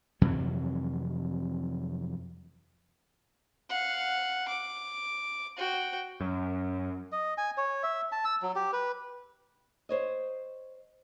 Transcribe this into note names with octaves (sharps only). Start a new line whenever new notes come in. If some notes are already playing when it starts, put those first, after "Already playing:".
F2 C3 E3 F#3
F5 F#5
D6
F#4 G5
F#2
D#5
G#5
C#5
E5
A5
E6
F#3
G4
B4
C5 C#5 D#5